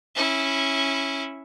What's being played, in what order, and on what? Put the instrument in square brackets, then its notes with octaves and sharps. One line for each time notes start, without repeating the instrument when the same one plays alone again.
[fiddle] C#4 E4